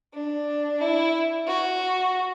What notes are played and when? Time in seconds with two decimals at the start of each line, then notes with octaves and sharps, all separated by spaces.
0.14 D4
0.81 E4
1.48 F#4